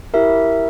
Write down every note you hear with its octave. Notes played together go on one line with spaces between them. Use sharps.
E4 G4 A#4 E5